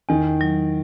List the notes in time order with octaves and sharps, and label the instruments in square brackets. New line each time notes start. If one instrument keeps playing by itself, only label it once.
[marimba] E2 [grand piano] D#3
[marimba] F#3